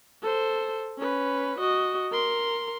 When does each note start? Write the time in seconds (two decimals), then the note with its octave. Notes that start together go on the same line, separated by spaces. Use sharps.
0.22 A4 C5
0.99 C#4 B4
1.59 F#4 D#5
2.12 A#4 C6